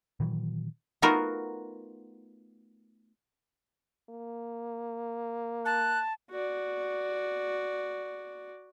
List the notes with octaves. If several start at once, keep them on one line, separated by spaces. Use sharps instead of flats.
A#2 D#3 E3 F#3
A3 B3 D#4 F4 F#4 A#4
A#3
A5 F#6
F#4 D5